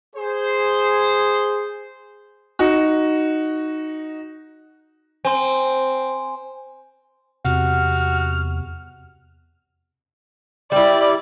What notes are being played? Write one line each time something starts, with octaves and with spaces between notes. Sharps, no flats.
G#4 C5
D#4 F#4
C4 G#5 C6
E2 C3 F#4 F6
G3 E4 D5